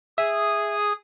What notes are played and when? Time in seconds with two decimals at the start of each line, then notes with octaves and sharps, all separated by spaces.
0.18 G#4 E5 D#6